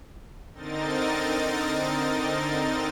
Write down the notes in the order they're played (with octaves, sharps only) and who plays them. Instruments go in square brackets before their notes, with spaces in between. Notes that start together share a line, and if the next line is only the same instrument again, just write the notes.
[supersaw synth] D3 C4 D#4 A#4 D#5 A6